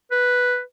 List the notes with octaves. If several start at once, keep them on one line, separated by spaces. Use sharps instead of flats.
B4